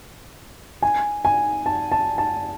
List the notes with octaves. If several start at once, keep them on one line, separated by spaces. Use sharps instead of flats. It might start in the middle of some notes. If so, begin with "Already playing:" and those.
G#5
G#5
A5
A5
A5